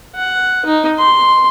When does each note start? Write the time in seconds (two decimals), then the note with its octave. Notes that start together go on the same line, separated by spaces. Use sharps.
0.15 F#5
0.65 D#4
0.99 C6